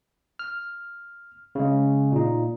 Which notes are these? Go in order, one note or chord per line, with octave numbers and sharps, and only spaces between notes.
F6
C#3 G#3
A#2 D#4